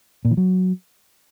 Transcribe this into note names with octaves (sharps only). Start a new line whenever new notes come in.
A#2
E3
F#3